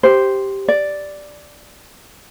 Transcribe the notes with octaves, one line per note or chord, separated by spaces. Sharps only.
G4 C5
D5